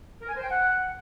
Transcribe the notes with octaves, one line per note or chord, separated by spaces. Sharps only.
A#4
G#5
C5
G5
F#5